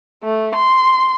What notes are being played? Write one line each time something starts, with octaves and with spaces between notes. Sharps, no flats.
A3
C6